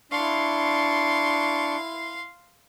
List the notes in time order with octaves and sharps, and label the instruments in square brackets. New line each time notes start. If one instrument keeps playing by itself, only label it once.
[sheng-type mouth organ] D4 C#6 [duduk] E4 [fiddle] F5 C6